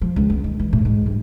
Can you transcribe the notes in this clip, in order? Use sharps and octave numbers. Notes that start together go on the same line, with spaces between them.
F3
C#2
B3
D#3
E3
A2
G#2
G1